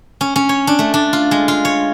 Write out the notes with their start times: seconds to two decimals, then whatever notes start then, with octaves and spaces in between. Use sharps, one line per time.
0.21 C#4
0.36 C#4
0.49 C#5
0.67 D4
0.79 A3
0.94 D4
1.13 F4
1.31 G#3
1.48 F4
1.65 C#5